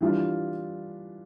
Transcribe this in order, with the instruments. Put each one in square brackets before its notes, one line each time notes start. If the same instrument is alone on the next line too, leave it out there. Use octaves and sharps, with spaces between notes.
[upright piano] E3 G3 D4 F4